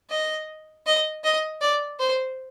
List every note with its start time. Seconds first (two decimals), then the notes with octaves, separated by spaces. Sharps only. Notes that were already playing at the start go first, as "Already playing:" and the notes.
0.10 D#5
0.86 D#5
1.24 D#5
1.61 D5
1.99 C5